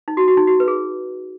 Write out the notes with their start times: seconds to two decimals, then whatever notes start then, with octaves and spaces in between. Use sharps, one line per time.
0.08 D#4
0.17 F#4
0.28 F#4
0.37 D#4
0.47 F#4
0.60 B4
0.68 G#4